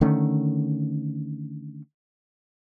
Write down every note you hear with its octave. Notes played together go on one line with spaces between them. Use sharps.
D3 D#3 A3 C#4